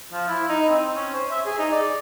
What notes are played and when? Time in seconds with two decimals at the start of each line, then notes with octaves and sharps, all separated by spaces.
0.12 F3
0.28 E4
0.49 D#4
0.68 C4
0.96 C#4
1.14 C5
1.31 E5
1.46 G#4
1.58 D#4
1.72 D5